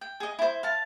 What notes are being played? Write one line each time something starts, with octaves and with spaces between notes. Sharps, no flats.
G5
G#4 D#5
E4 C5
F5 A5